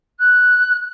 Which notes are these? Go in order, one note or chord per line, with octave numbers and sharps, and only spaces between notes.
F#6